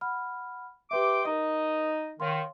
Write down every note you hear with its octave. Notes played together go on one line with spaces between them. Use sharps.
F#5 B5 F6
G4 B4 E5 G5 C6 D6
D#4 A#4 D#5 D#6
D#3 C#5 F5 C6